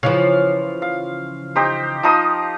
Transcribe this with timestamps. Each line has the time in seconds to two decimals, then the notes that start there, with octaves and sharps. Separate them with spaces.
0.03 C#3 E3 F3 F5
0.82 F5
1.56 D#4 G4 C5
2.03 F3 D#4 D#6